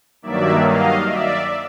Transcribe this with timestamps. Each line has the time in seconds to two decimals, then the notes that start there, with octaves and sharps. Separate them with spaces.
0.22 G2 D#3 F#3 A#3 D5 E5
0.64 D#5 F5
1.06 D5 E5